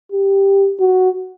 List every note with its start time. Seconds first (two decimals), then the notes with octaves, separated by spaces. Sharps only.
0.12 G4
0.80 F#4